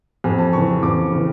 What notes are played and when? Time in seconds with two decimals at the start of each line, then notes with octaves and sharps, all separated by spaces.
0.24 F2 G#5
0.39 A5
0.53 C#3 E3 C#6
0.82 F2 D6
1.12 C#3 E3